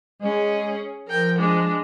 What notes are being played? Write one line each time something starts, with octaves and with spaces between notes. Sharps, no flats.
G#3 C#4 G#4
F3 A#4 G5
G#3 D4